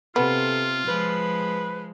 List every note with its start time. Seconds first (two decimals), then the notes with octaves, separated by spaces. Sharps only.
0.16 C3 B3 F4 A4
0.88 F3 G#3 B4